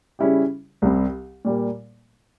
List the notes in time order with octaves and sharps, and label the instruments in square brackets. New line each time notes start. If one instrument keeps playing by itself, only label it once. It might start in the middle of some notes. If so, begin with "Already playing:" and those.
[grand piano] C#3 G3 C#4 E4 G4
C2 C3 G3 C4
A#2 G3 A#3